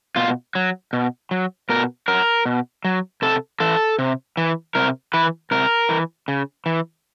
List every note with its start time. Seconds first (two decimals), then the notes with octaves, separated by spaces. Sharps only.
0.16 B2 F4
0.55 F#3
0.93 B2
1.31 F#3
1.69 B2 A#4
2.08 F#3 A#4
2.46 B2
2.85 F#3
3.22 C3 A4
3.60 E3 A4
3.99 C3
4.37 E3
4.75 C3 A#4
5.14 E3 B4
5.51 C3 A#4
5.89 E3
6.28 C#3
6.66 E3